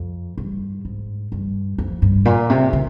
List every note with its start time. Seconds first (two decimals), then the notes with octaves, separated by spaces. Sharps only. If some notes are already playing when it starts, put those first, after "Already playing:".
Already playing: F2
0.38 G2
0.85 G#2
1.32 G2
1.78 F2
2.02 G2
2.25 A#2
2.50 C3
2.73 D3